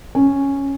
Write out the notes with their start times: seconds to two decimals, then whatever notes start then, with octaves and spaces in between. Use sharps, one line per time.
0.15 C#4